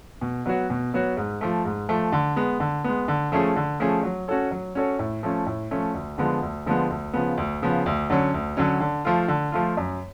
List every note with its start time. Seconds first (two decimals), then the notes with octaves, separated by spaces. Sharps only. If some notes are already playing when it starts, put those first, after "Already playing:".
0.21 B2
0.46 F#3 B3 F#4 C#5
0.70 B2
0.93 F#3 B3 F#4 C#5
1.17 G#2
1.41 F3 A3
1.65 G#2
1.89 F3 A3
2.12 D3
2.36 G#3 B3
2.60 D3
2.84 G#3 B3
3.08 D3
3.32 F3 A3 C#4 G#4
3.56 D3
3.80 F3 A3 C#4 G#4
4.03 F#3
4.28 C#4 F#4 A4 C#5
4.51 F#3
4.75 C#4 F#4 A4 C#5
4.99 A2
5.23 F3 A3 C#4
5.46 A2
5.71 F3 A3 C#4
5.94 D2
6.18 D3 F3 G#3 B3
6.42 D2
6.66 D3 F3 G#3 B3
6.90 D2
7.13 C#3 F3 B3
7.37 D2
7.62 C#3 F3 B3
7.86 D2
8.10 D3 F#3 C#4
8.34 D2
8.57 D3 F#3 C#4
8.80 D3
9.05 F3 A3 F4
9.28 D3
9.52 F3 A3 F4
9.77 F#2